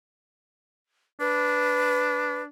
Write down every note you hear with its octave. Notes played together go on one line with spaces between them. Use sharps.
D4 B4